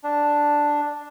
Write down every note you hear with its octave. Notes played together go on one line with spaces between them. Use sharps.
D4